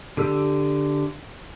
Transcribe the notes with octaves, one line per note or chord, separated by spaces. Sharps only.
D3 G4 E6